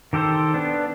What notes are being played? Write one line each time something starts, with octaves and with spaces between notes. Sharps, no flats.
D#3 G4 A4 C5
B3 D4